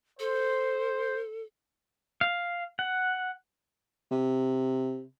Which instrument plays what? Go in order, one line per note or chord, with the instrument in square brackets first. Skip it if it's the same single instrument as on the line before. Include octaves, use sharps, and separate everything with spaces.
[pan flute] A4 [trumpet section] C5
[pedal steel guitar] F5
F#5
[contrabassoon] C3